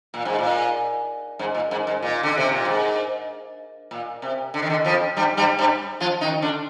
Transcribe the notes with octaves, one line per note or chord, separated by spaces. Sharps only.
A#2
G#2
A#2
G#2
A#2
G#2
G#2
A#2
D3
C3
A#2
G#2
A#2
C3
D3
D#3
D3
F2 F3
G2 G3
G2 G3
G2 G3
F3 F4
D#3 D#4
D3 D4